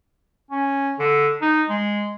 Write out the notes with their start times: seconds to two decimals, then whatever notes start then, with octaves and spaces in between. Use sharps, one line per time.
0.51 C#4
0.99 D3
1.42 D#4
1.70 G#3